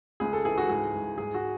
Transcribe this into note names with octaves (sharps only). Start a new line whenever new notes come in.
C#2 G#4
A4
E3 G#4
F#4
G#2 G#4
G#2
G#2 G#4
F#4